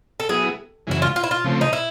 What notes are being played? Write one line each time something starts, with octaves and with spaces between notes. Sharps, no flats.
A4
F#3 B3 E4 G#4
F#2 C#3 E3 G#3 E4
F4
F4
E4
F4
C#3 F3 A3 C4
D#4
E4